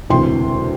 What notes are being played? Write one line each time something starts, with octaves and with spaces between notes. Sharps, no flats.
E1 D2 C3 E3 G5 C6